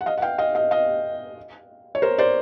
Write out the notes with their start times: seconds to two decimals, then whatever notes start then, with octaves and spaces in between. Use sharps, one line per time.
0.01 F#5
0.06 D#5 F5
0.18 F#5
0.22 F5 G5
0.38 D#5 F5
0.55 D#5 F5
0.71 D#5 F5
1.95 C#5
2.02 A#4 C5
2.18 C5 D5